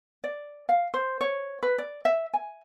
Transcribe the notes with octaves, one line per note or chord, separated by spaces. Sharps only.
D5
F5
C5
C#5
B4
D5
E5
G#5